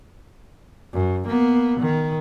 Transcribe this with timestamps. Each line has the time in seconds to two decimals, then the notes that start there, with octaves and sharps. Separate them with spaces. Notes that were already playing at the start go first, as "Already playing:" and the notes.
0.93 F#2
1.28 A#3 B3
1.80 D#3